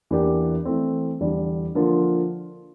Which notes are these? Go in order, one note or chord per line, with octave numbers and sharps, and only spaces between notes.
E2 E3 A#3 D4 G4
E3 A3 C4
E2 D3 G3 D4
D3 F3 A#3 F4